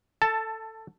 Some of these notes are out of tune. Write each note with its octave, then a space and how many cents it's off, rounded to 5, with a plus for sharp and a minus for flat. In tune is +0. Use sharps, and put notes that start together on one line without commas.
A4 +15 A5 +0